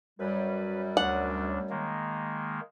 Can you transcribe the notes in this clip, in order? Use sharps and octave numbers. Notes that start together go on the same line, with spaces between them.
F#2 G3 B4
D2 D4 F#5
D#3 G#3 A#3